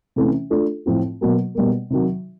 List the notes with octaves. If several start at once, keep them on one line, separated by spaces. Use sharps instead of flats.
C3 E3 A3 C#4
A3 D4 F4 A4
A2 F3 A3 C4 F4
B2 F#3 A#3
B2 G3 A#3
C3 D#3 F#3